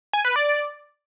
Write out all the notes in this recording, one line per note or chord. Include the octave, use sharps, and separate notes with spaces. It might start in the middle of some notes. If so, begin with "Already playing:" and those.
G#5
B4
D5